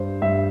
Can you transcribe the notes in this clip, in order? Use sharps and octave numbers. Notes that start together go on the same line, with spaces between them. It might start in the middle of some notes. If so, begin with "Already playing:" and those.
Already playing: G2 C5
G2 E5